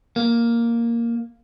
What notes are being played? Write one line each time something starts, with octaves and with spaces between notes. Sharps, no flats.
A#3